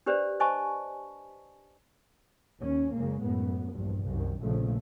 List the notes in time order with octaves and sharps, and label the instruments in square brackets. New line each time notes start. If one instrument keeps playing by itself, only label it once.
[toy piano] D4 G4 B4 C5 D5
C5 D#5 G#5 A5 C#6
[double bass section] D#2 C#4
F#1 C#3 G#3 A#3
F#2 A2 B3
A#1 E2 G2
C2 F#2 D#3
F1 A#1 A#2 C#3 F3 A3